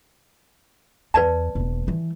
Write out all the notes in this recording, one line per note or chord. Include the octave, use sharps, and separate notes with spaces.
E2 B4 D5 A5
E1 A#3
E3 G3